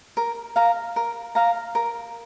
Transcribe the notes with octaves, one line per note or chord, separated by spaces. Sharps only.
A#4
F5 A#5
A#4
F5 A#5
A#4